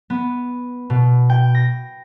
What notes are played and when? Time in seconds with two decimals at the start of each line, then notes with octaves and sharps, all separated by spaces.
0.10 B3
0.90 B2
1.30 G5
1.55 A#6